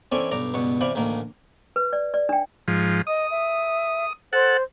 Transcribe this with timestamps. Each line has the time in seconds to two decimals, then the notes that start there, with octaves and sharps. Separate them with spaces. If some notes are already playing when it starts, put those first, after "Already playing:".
0.12 E3 C4 C#4 E4 A4 D5
0.31 B1 G2 D5 A#5
0.54 C#2 G2 B2 C#6
0.81 C3 E3 D5 F5 B5
0.95 A1 D2 D#3 A#3
1.76 B4
1.93 D5
2.14 D5
2.29 D4 G5
2.68 G#2 F3
3.07 D#5 D#6
3.30 E5
4.33 A4 C5 F#5